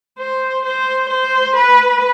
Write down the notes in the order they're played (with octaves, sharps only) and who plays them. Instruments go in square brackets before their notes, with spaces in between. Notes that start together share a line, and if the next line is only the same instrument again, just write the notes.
[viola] C5
C5
C5
B4